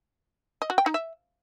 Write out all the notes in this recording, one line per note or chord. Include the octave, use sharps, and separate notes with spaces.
D#5
F#4
G5
D#4
E5